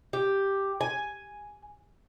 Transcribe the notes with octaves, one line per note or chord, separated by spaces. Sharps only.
G4
G#5